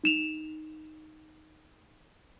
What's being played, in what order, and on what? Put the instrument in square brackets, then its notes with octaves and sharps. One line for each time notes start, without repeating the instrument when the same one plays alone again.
[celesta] D#4 E7 F7